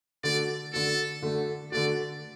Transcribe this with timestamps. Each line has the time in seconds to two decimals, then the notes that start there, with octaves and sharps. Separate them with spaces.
0.24 D3 A3 F#4 D5
0.73 D3 A3 F#4 A4
1.22 D3 A3 F#4
1.72 D3 A3 F#4 D5